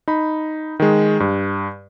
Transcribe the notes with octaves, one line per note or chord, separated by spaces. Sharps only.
D#4 B5
D#3 G#3
G2